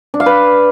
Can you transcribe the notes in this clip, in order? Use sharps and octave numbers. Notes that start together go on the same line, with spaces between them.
D4
F5
B4